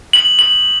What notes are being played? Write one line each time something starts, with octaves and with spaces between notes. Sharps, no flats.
F#7
F#7